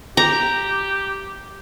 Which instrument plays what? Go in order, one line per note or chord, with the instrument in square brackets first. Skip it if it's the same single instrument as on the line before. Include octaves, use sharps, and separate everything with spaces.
[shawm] G4 [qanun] A#5